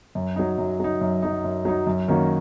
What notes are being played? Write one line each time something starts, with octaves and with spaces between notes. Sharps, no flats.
F#2
F#3 D#4
F#2
F#3 D#4
F#2
F#3 D#4
F#2
F#3 D#4
F#2
D#3 A#3 C#4 F#4